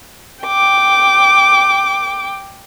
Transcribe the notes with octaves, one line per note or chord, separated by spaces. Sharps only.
G5 D6